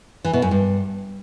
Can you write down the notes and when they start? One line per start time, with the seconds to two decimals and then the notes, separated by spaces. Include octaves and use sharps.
0.25 E3
0.33 B2
0.42 F#2
0.51 G2